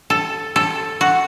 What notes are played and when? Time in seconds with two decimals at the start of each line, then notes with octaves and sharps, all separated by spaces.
0.10 A4
0.56 A4
1.01 F#4